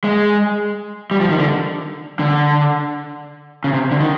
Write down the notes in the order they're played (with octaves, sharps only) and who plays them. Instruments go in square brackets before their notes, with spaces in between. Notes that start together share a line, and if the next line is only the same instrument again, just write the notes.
[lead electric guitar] G#3
G3
F3
D#3
D3
D3
C#3
C3
D3
D#3